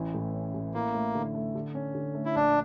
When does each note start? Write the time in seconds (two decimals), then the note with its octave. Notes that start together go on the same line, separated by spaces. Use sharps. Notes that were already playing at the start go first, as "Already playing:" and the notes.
Already playing: A1 E3
0.14 A2
0.34 C#4
0.55 A2
0.74 A#3 E4
0.94 A3
1.15 D3
1.35 A3
1.55 D3
1.75 C#4
1.95 D3
2.14 A3
2.25 E4
2.35 A#1 D4